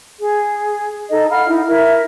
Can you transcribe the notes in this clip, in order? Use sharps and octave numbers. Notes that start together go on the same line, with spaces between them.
G#4
D#4 A4 D#5
F5 F#5 B5 F6
D#4 E4
E4 A#4 E5